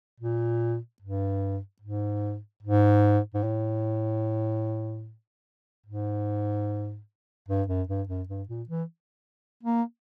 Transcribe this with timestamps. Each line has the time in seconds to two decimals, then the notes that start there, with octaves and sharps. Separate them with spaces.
0.20 A#2
1.02 G2
1.82 G#2
2.63 G#2
3.34 G#2
3.44 A2
5.86 G#2
7.48 G2
7.68 F#2
7.88 G2
8.08 F#2
8.28 G2
8.48 A#2
8.69 E3
9.63 A#3